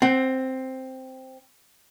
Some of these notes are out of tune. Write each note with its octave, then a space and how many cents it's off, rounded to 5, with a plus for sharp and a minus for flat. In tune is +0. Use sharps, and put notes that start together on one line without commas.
C4 +0 F#5 +35